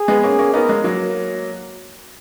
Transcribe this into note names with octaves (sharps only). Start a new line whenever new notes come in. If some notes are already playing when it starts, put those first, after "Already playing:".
Already playing: G#4
G#3 B3
A#3 C#4
A#3 C#4
B3 D#4 A#4
G#3
F#3 A#3